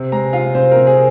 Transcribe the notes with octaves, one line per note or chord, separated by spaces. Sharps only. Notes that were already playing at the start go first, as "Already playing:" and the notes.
Already playing: C3
G#3 A#5
F4 F5
C3 C5
A#4
C3
G#4